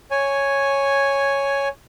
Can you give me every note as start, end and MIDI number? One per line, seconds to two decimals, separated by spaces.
0.11 1.68 73
0.11 1.68 80